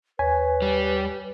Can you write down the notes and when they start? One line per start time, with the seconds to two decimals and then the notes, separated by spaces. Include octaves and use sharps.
0.19 D#2 B4 C#5 G#5 B6
0.62 G3